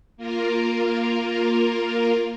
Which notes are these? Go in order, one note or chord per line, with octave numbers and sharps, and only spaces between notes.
A#3 F4 A#4